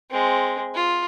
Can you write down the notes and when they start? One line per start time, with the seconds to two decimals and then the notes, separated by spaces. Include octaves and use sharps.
0.10 G#3 C4
0.74 F4